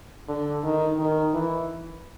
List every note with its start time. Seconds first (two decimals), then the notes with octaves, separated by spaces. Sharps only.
0.28 D3
0.63 D#3
0.98 D#3
1.33 E3